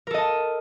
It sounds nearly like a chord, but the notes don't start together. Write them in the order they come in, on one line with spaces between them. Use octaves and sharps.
A#4 A4 D#5 A5